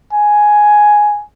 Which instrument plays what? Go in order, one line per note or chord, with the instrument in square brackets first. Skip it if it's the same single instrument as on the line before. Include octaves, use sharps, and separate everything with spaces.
[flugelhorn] G#5